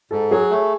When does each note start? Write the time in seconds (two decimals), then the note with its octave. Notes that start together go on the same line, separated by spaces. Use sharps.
0.11 G#2 A4
0.31 F#3 G#4
0.50 A3